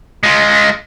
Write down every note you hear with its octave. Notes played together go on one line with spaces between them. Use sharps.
G#3 F4